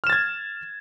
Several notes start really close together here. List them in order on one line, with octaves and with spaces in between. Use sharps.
F6 E7 A6 G#6